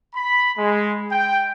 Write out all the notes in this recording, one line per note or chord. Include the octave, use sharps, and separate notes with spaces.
B5
G#3
G5